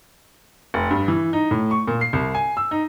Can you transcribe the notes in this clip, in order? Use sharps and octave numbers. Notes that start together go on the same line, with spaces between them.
F1
G2
E3
D#4
A2
C#6
A#2
C7
C2
G#5
E6
D#4